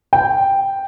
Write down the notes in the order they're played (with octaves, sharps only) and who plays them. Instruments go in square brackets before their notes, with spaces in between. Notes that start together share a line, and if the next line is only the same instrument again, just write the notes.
[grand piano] G5